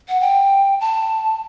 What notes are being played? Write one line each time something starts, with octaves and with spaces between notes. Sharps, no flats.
F#5
G5
A5